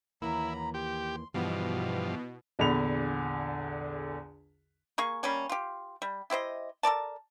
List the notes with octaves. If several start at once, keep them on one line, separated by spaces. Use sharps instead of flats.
D#2 E3 F#3 A#3 E4 A#5 B5
G4 C6
G2 B2 E3 F3 B3
A#1 E2 D3 B5 F7
A#3 G#4 C#6
G3 A#3 C#4 C#5
F4 G4
G3
E4 G4 C5 D#5
A4 A#4 D5 A5